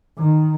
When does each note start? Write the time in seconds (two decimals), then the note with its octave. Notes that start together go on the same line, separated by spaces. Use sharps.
0.18 D#3